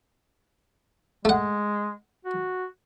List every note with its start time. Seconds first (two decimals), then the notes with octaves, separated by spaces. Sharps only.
1.25 G#3 A3 F#5
2.25 F#4